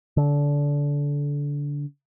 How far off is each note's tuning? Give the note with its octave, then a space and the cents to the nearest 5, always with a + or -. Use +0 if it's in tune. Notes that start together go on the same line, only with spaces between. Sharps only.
D3 -25